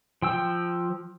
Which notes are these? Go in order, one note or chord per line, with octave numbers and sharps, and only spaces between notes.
F3 G5 E6